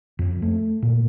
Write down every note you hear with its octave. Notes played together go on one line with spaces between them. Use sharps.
F2
A3
A#2